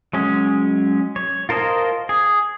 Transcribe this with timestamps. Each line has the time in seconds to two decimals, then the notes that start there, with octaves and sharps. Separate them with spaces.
0.13 F#3 G#3 C#4
1.16 C#5
1.49 F4 A#4 C5 D#5 A5
2.09 G#4